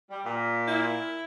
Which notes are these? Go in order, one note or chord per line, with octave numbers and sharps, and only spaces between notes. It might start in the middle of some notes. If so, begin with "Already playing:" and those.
G3
A#2
E4